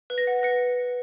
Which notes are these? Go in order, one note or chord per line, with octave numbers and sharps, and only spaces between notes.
B4
A#6
F#5
B4 C#7